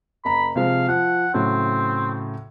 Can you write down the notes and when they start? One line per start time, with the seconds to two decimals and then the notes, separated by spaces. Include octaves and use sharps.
0.25 F#1 A#5 B5
0.56 C3 F3 G#3 F5
0.88 F3 F#5
1.34 A2 C#3 F#3 C4